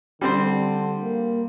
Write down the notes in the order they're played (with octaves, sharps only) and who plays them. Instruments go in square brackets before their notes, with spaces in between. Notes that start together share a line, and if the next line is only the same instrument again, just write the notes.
[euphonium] D3 [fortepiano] G3 C4 C5
[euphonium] A#3